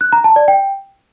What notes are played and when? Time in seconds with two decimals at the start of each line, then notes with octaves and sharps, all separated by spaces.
0.01 F#6
0.13 A#5
0.24 A5
0.36 D5
0.48 G5